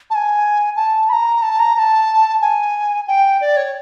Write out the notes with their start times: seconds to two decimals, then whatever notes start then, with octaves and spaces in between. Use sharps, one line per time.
0.10 A5
0.15 G#5
0.76 A5
1.09 B5
1.13 A#5
1.42 A5
1.59 A#5
1.75 A#5
1.79 A5
2.41 G#5
3.08 G5
3.41 D5
3.57 C#5